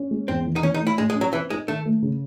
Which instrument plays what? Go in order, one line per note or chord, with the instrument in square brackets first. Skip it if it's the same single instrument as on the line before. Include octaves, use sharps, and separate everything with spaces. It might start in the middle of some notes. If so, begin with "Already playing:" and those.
Already playing: [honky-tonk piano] C#4
G#3
[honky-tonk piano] E2 [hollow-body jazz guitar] C4
[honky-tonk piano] E3
[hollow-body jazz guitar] D#4
[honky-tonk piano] E3 [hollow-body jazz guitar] C#4
[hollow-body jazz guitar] D#4
[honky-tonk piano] A3
[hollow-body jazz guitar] E4
[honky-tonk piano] A2 [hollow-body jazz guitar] G#3
[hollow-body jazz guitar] G#3
[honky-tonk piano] C#4
[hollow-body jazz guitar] F#3
[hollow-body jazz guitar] E3 [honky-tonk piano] C4
[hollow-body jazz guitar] G#3 [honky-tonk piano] D#4
[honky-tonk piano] D#3 [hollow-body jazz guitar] A3
[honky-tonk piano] A3
C#3